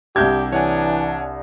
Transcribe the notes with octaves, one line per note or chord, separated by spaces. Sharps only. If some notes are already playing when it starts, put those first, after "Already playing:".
C2 D4 G4 E5 G6 G#6
E3 D4 C#5 F#5 G#5